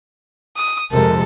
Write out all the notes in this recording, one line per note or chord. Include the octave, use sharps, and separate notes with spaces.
D#6
F2 C3 G#3 A4 A#4